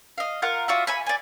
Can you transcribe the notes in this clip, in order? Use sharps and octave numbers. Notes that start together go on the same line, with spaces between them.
D#5 F5
F4 A#4 F#5
F4 F#4 D5 E5
E5 G#5 B5
D5 G#5